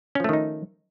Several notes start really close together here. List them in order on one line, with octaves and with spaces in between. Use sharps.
C#4 F3 A3 D#3 D#4